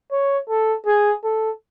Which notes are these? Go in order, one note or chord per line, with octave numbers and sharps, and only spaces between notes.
C#5
A4
G#4
A4